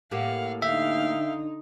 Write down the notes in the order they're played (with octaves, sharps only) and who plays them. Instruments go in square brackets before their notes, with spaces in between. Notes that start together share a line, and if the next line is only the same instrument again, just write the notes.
[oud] A2 A#3 G4 [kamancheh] F5 F#5
[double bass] D3 D#4 [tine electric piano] E5 [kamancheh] F5 G5